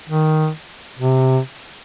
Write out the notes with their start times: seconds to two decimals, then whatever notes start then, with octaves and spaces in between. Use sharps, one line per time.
0.09 D#3
0.99 C3